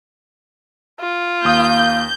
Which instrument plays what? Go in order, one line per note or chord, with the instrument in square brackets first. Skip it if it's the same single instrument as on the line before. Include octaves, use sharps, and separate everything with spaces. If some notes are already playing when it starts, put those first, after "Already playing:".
[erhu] F4
[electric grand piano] D#2 D#6 [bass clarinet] A#3 [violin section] G6